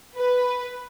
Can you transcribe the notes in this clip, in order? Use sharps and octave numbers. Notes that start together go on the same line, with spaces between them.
B4